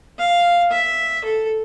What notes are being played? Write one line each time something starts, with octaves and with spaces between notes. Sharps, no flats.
F5
E5
A4